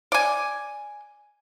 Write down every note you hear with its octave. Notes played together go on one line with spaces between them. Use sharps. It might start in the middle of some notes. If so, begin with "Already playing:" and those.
D5 G#5